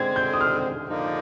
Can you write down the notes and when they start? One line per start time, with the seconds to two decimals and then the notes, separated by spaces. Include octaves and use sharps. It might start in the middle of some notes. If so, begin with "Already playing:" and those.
Already playing: D3 G#3 C4 G#6
0.16 G6
0.33 D#6
0.41 F6
0.88 D3 F3 A#3 D#4